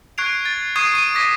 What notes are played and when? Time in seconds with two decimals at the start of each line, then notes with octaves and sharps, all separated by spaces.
0.18 C#6 F#6 G#6 C7 D7 F7
0.45 A6
0.76 C#6 D#6 G#6 C7 D#7
0.93 C#6 D#7
1.15 D6 G#6 A#6 B6 D#7